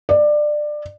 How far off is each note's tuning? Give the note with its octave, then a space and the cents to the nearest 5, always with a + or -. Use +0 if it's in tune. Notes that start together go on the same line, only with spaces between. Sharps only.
D5 +20